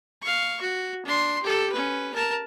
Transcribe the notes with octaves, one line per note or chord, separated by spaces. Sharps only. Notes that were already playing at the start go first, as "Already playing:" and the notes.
F5 C#6
F#4
D4 C6
G4 A4
C#4 B4
A#4 A5